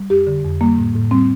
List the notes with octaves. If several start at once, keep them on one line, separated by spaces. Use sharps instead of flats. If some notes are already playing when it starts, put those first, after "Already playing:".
Already playing: G3
F2 G4
D3
F2
G3 A#3
A2
A2
G3 C4